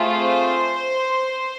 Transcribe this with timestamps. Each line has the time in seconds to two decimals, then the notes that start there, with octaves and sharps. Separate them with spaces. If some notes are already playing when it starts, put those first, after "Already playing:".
Already playing: A3 C4 F4 G#4
0.17 C5